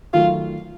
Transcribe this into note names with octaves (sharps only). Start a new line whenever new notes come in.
D#3 F#3 A3 F4